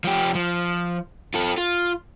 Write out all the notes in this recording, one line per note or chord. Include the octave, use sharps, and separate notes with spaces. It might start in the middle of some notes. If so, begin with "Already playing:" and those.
F3 G4
F3
F4 A4
F4